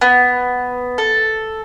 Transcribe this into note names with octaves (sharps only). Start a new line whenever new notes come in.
B3
A4